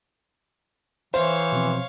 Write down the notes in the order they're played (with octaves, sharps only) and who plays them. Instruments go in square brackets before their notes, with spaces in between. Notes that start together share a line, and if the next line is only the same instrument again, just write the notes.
[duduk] E3 [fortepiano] C5 [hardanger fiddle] C#5 F5 [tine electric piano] E5
[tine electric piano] B2 F3 C4